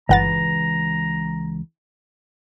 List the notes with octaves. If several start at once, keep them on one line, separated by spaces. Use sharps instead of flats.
G1 C#2 E3 B4 F#5 A#5 A6